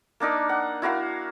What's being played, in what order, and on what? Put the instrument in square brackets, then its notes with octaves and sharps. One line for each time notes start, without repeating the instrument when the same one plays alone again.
[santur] A#3 D4 D#4 A#4
F#5
E4 F#4 A#4 F5